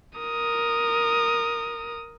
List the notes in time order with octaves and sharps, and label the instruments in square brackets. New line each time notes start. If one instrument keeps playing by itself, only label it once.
[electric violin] A#4 D#6